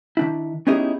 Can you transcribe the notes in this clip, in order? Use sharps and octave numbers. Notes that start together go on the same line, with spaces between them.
D#3 D4 E4
B3 C#4 D#4 E4 G4 G#4